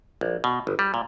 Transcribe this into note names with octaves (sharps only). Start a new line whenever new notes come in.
A#1
B2
G1
G3
A#2